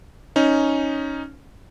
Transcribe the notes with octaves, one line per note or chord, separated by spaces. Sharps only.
C#4 D#4